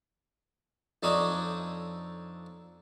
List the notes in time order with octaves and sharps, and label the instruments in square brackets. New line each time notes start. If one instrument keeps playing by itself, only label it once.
[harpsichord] F2 D4 D#4 A4 C#5 D#6